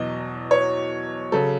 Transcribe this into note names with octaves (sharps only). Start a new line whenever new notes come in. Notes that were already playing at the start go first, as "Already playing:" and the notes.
Already playing: E2 B2 F#3 D#5
C#5
C#3 F#3 A4